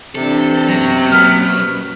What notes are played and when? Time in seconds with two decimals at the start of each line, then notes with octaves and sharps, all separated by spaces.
0.15 C3 E3 D4 A4
0.69 F#2 B2 F#3 A#3 A#5
1.12 B3 F6